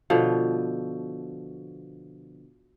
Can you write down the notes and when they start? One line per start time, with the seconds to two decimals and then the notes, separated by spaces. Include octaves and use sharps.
0.10 B2 D3 F3